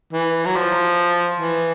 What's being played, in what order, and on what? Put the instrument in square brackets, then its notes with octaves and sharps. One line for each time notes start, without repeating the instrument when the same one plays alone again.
[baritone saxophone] E3
F#3
F3
E3